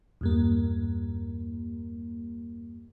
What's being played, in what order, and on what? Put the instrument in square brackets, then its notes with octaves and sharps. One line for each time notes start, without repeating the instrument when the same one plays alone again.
[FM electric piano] E2 G2 A#3